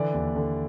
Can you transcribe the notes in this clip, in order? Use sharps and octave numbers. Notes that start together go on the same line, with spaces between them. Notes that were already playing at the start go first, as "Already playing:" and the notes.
Already playing: D3 E3 D5
D#2
D3